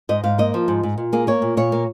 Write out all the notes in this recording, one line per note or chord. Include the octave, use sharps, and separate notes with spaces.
G#2 D#5
G#2 F5
A#3 D#5
F3
G#2
G#2
A#2
A#3 G#4
A#3 C#5
A#2
A#2 C#5
A#3